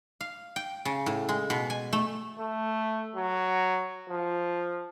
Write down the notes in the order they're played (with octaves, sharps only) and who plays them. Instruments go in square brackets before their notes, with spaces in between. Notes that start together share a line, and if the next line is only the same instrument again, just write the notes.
[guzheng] F5
G5
C#3
A2
G#3
B2
G#5
A3
[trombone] A3
F#3
F3